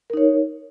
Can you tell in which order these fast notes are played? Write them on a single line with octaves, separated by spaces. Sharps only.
A#4 D#4 C#5